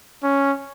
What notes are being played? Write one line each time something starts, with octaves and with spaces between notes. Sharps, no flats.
C#4